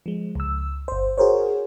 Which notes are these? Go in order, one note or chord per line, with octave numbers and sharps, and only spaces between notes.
F3 G#3
C#2 E6
G1 C5
F#4 G#4 A#4 C5 C#5